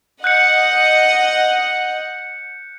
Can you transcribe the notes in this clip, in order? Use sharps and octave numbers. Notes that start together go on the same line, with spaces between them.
D#5 F#5 F#6 G6 C#7